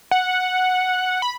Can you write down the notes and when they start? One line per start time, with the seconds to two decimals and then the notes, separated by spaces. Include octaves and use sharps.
0.11 F#5
1.22 B5